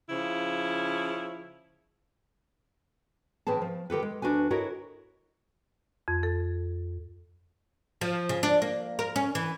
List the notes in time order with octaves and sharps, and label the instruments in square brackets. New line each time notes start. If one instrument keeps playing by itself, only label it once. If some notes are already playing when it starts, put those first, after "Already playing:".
[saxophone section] C#3 F3 E4
[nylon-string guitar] A2 E3 C4 G#4 A5
F3
D#3 G4 A4 B4
G#3
D2 D4 F#4 B4 G#5
E4 F#4 A4 A#4 C#5 D#5
[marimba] F2
A4
[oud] F3
C#3
D4
A#3
A#4
C#4
E3